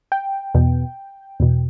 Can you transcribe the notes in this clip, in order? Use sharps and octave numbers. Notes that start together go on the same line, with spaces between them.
G5
E2 B2
E2 B2